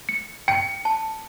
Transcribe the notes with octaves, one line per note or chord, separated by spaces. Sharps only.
C#7
G5 C#7
A5